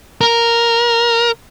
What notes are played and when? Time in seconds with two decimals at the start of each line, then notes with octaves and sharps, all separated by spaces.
0.21 A#4